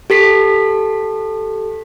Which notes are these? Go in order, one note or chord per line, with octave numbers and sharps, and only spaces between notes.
G4 A4 B6 C7